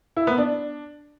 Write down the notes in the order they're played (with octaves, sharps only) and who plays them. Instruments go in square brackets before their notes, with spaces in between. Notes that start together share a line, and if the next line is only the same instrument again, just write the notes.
[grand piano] E4
B3
D4